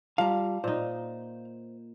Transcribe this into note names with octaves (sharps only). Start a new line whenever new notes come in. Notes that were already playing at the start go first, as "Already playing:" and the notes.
G3 F4 F5 A5 A#5
A#2 D#4 C5